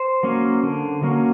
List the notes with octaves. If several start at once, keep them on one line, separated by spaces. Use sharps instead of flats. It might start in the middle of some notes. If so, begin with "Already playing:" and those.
Already playing: C5
F#3 A#3 C#4
D3
F#3 A#3 C#4